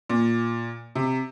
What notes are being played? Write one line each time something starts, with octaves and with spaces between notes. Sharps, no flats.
A#2
C3